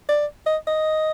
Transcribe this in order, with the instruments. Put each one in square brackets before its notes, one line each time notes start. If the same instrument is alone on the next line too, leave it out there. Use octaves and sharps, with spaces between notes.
[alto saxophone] D5
D#5
D#5